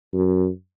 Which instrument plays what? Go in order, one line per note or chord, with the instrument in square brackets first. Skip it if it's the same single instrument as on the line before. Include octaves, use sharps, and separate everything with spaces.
[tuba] F#2